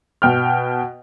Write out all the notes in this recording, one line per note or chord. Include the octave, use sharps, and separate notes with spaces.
B2 G5 F6